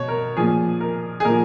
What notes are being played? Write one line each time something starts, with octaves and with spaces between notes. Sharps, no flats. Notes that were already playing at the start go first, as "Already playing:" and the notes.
Already playing: B2 C#5
A#4
A#2 F3 G#4
A#4
G#4
A#2 F3 A#4